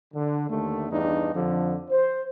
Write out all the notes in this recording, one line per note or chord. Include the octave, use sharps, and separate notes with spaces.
D3
D#2 D3 A3
E2 G2 D4 D#4
F2 D3 F3
C5